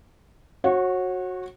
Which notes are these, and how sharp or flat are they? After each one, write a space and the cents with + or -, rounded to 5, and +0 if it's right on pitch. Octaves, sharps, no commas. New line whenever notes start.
F#4 -10 C#5 -35